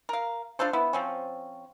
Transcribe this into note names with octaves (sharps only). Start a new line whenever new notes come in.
A#4 F5
D4 F4 A4 C5
B3 E4
F3 C4 C#4